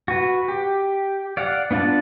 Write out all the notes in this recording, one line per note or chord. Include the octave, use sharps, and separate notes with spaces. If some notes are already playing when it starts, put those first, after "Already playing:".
F#4 B4
G4
D5 F5 F#5
B3 D4 F4 F#5 A5